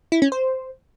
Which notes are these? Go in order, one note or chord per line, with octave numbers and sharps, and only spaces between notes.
E4
C#4
C5